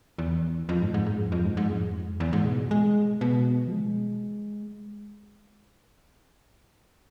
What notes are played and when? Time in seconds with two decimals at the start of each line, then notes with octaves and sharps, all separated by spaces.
0.18 E2
0.69 F2
0.82 G#2
0.94 G#2
1.06 G#2
1.19 F2
1.32 F2
1.45 G#2
1.57 G#2
1.70 F2
2.20 E2
2.33 G#2
2.45 B2
2.71 G#3
3.21 B2
3.67 F3
3.72 G#3